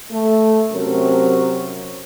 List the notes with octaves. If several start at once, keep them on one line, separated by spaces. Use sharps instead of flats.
A3
C3 F#3 C4 C#4 A#4